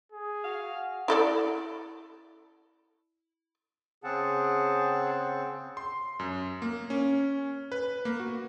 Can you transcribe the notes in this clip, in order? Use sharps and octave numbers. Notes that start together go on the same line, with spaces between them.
G#4
F#4 F5
E4 A4 D5
C#3 C4 G#4 F#5 A5
C6
F#2
A#3
C#4
B4
A#3
F#4